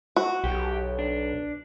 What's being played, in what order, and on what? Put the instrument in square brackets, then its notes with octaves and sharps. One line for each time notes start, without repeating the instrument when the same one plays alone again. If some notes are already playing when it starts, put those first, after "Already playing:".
[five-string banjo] F#4
[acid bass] B1 [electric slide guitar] G4
[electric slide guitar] D4